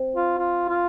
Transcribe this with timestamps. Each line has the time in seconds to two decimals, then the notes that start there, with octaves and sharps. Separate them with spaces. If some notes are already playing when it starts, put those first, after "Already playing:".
Already playing: C4
0.16 F4
0.38 F4
0.69 F4